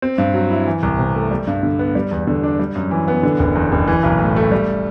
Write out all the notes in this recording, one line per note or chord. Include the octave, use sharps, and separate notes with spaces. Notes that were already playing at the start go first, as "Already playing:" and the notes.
C4
G2
F#3
E4
E3
C2
C3
A3
G3
G2
D3
B3
G3
E2
D3
D4
G3
F#2
E3
B3
D3
F#1
E2
F#1
E3
B1
A2
A3
G3